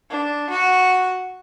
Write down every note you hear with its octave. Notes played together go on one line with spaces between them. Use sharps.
D4
F#4